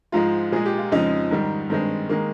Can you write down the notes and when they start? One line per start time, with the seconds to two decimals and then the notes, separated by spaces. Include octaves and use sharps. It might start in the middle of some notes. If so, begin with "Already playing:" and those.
0.12 G#2 F3 G#3 F4
0.52 A#2 G#3 G#4
0.66 G4
0.78 F4
0.92 F2 C#3 F3 G#3 D#4
1.31 G#2 D#3 G3
1.70 G2 D#3 G#3 C4
2.09 D#3 G#3 A#3